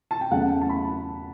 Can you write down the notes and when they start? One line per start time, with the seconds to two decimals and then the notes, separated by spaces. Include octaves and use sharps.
0.11 A5
0.21 G5
0.31 E2 C#3 F#3 A3 F#5
0.61 A5
0.69 B5